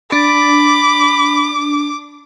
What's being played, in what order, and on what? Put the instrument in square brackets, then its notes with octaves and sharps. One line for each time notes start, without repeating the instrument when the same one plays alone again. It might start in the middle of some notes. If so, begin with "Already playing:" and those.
[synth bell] D4 [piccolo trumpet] B5 [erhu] D6